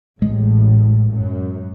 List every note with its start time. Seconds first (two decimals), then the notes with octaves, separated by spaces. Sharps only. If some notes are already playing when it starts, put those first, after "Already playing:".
0.22 A1 A2 G#3
1.12 F#2